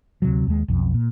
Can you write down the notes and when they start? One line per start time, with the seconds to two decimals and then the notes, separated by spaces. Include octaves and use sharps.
0.22 D2 C3 F#3
0.47 D#2 G#3
0.68 B1 F2
0.94 A#2